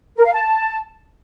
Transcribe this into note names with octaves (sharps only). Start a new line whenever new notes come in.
A#4
F5
A5